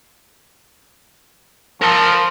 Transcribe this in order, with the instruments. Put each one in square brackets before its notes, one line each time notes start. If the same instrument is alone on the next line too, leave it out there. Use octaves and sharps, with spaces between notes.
[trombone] F3 [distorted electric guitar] A#4 A5